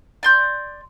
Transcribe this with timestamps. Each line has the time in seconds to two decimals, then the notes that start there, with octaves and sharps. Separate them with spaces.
0.23 D5 C6 G6